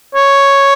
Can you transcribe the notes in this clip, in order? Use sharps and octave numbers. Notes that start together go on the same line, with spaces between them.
C#5